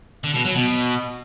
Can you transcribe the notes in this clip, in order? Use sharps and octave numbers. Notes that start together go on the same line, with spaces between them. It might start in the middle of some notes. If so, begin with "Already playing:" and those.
D3
B2
F#3
B2